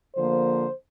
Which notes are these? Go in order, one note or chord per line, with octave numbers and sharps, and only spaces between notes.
D3 F3 A#3 C5